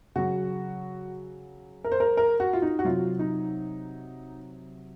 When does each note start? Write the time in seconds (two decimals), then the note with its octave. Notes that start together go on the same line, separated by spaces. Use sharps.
0.16 C#3 F#3 F#4
1.84 A#4
1.92 C5
2.00 A#4
2.17 A#4
2.40 F#4
2.53 F4
2.62 D#4
2.79 F#4
2.85 C3 F#3 F4
3.19 D#4